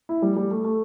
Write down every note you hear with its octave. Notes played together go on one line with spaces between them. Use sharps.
E4
G3
G3
A3
A3